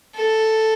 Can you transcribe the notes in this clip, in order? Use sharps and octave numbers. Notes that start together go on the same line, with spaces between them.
A4